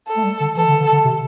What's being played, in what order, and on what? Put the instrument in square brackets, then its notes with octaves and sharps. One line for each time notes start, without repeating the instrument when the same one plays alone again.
[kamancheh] A4
[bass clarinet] A3
G3
D3
[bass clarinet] E3 [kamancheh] A4
[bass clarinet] D3
D3
D3
C3